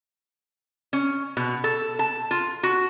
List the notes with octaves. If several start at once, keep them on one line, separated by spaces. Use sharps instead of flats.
C#4
B2
A4
A5
F4
F#4